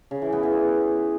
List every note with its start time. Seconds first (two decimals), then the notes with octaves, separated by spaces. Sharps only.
0.11 C#3
0.22 E3
0.32 B3
0.43 E3